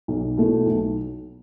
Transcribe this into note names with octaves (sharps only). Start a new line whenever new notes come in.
B1
B2 A3 E4
B1